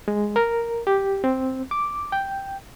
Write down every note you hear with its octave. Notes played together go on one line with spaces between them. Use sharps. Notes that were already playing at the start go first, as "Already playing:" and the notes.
G#3
A#4
G4
C4
D6
G5